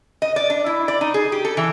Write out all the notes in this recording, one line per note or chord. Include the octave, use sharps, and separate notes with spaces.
D#5
D5
D4
E4
D5
D#4
G#4
G4
A4
E3